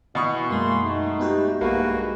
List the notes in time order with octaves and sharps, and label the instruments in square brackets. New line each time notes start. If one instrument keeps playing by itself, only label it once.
[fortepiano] B2 C#6 [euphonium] E3
[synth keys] F#2 G#3 [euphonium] A#3 [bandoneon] C6
[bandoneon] A3 [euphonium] D#4
[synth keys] B3 F#4 G4
[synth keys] B1 [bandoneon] G2 F#4 B4 [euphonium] G#3 [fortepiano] A#3